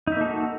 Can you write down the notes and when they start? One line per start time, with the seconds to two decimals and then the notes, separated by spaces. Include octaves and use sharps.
0.07 D#4
0.12 E5
0.16 A#3
0.21 A4
0.26 F#4